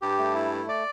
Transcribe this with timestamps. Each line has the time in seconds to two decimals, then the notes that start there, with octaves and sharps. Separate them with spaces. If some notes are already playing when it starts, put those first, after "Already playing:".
0.02 G2 G4
0.18 A3
0.35 E4
0.52 A3
0.69 D5